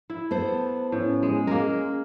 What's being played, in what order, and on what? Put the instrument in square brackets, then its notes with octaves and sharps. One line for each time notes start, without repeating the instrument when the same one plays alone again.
[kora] E4
[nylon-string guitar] B3 A4 C5 [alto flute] A5
[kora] A2 [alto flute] C#4
[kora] G#3
[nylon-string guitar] G#3 [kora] A#3 A#4